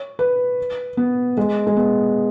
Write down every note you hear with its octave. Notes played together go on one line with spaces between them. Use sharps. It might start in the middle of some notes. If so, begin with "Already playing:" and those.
Already playing: C#5
B4
B3
G#3
G#3
B3